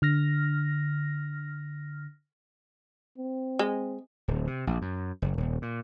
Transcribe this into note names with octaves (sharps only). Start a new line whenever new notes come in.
D3 F6 A#6
C4
G#3
D1
C3
A#1
F#2
F#1
D#1
A#2